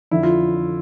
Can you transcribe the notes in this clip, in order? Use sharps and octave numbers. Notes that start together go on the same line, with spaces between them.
F2 D3 E4
F4